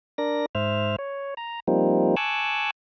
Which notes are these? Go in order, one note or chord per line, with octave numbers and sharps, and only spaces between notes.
D4 A#4 D5 A#6
G#2 C5 E5 F6
C#5
A#5
F3 G3 A#3 C4 D#4
G#5 A5 C#6 D6 E6 F#6